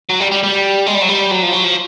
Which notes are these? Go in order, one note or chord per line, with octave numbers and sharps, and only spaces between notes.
F#3
G3
G3
G3
G#3
G3
F#3
G3
F#3
F3
F#3
F3